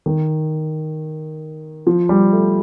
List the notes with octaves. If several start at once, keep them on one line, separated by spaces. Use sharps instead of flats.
D#3
F3
G3
A3